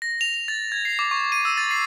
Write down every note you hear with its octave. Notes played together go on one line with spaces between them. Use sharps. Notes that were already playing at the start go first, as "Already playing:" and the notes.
A#6
F7
F7
A6
G#6
C7
D6
C#6
D#7
E6
A6
C7